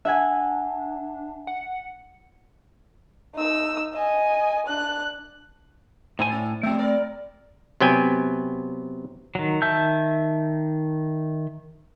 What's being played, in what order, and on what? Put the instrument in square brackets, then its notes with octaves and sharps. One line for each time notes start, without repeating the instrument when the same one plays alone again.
[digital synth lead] D4 [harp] E5 F#5 G#5
[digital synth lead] F#5
[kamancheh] D#4 E6
D#5 G#5
D4 F#6
[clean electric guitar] A2 E4 G#5 [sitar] C5
[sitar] C#4
[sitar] F3 G3 [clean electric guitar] A3 C4
[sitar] E4 A#4 D5
[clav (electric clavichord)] C3 F#3 B3 G5 G#5
[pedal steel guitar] D#3 F#3
D#3 E5 A5 E6 G6